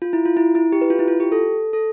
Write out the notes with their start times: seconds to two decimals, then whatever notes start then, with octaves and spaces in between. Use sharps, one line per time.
0.02 F4
0.13 E4
0.25 F4
0.37 E4
0.55 E4
0.72 G4
0.81 B4
0.90 F4
0.99 E4
1.08 F4
1.20 G4
1.32 A4
1.73 A4